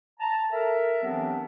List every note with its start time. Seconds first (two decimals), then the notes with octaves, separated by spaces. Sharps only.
0.20 A5 A#5
0.50 A4 A#4 E5
1.03 E3 F#3 B3 C4 D4 G4